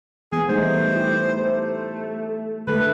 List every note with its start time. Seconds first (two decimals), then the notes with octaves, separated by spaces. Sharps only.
0.32 E3 B3 G#4
0.49 G3 A3 D#4 C5
0.92 E4 G4
1.35 A3
2.67 D3 A3 A4 B4